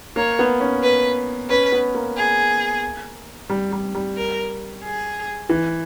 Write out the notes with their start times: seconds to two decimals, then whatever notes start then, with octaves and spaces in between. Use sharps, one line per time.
0.16 A#3 C#5
0.39 B3
0.60 C#4
0.83 B4
1.49 C#4 B4
1.72 B3
1.94 A#3
2.17 G#4
3.50 G3
3.72 G3
3.95 G3
4.17 A#4
4.83 G#4
5.49 E3